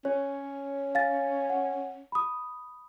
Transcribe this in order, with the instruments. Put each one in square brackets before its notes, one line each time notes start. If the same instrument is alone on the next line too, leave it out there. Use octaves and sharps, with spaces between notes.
[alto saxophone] C#4 [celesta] C#5
[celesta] F5 G#5 A6
F#5
B5 D#6